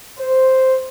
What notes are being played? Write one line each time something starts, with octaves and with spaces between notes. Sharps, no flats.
C5